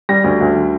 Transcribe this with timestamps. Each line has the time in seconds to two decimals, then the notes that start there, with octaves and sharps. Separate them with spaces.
0.09 G3 A#6
0.24 D2
0.40 D2
0.55 D3